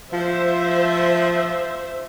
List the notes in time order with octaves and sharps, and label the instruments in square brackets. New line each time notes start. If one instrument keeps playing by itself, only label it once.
[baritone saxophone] F3 [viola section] C5 E5